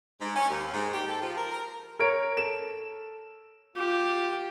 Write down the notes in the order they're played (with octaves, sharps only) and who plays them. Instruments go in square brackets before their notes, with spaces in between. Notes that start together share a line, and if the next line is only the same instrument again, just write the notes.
[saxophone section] G#2
C#4
D#2
G#2
G4
A4
F3
A#4
A#4
[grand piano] A#4 C#5 D7
A4 E7
[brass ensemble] F4 [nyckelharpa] G4